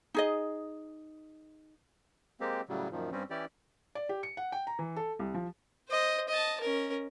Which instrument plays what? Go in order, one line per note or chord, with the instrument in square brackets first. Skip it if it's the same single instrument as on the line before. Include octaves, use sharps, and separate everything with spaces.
[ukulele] D#4 G#4 D#5
[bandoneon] G#3 A#3 C4 G4
A2 C#3 F#3 G3
F#2 A#2 D#3 F3
G2 G3 C4 C#4
E3 C#4 E4 G4 D5
[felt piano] D5
G4
C#7
F#5
G5
A#5
E3
A4
C2
F3
[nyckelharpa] C5 D#5
D#5 A5
C#4 A#4